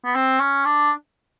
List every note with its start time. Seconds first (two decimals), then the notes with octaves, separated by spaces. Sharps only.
0.05 B3
0.15 C4
0.40 C#4
0.65 D4